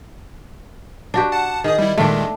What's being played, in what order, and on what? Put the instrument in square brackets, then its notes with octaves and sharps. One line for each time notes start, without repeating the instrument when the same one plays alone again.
[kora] D4 F#4 G4
[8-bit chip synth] F#5 A5
[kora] D#3 [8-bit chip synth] G#4 D#6
[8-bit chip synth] G3 E4
[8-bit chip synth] A#2 D#3 G#3 [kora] A3 D4